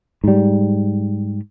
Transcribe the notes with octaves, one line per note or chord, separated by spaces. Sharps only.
G#2 G3